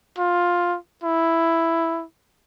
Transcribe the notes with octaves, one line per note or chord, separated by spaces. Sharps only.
F4
E4